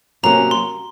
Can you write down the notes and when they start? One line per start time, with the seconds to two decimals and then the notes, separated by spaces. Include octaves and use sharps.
0.23 C3 F#3 A#3 C#4 F#4 A#5
0.51 C6